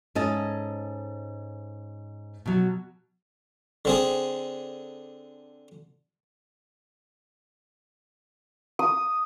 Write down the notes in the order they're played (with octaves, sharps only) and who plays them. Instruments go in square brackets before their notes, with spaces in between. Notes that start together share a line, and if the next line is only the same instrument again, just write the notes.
[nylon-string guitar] G#2 C#4 A4 D#5 A5
B2 F#3
[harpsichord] D3 C4 G#4
[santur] D#6